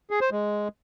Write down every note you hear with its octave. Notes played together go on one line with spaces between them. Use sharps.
G#4
C5
G#3